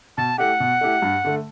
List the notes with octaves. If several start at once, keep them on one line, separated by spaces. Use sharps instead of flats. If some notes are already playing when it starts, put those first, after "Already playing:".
B2 A5
A3 E4 G4 F#5
B2
A3 E4 G4
G2
D3 A3